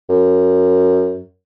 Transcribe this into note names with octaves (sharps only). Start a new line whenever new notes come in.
F#2